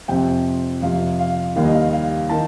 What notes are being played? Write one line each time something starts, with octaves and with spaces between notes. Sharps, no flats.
F2 C3 F3 G5
F2 C3 F3 F5
F5
D#2 D#3 G3 F5
D#5
F5
F5
D#3 A5